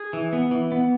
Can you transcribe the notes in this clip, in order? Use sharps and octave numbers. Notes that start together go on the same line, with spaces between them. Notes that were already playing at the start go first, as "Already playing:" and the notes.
Already playing: G#4
E3
B3
E3
B3